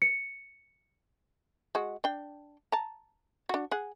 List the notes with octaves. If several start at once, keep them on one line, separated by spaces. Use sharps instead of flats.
C#7
G#3 F#4
D4 G5
A5 A#5
D4 F#4
G#4 F#5